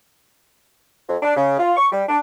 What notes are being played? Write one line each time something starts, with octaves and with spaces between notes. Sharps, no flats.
F2
D4
C#3
F4
C#6
G3
D4